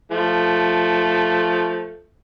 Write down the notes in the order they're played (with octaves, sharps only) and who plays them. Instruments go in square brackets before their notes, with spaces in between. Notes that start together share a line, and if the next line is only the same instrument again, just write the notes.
[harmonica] F3 A3